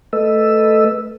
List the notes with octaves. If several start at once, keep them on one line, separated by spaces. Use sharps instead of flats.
A3 A4 B4 D#5 E6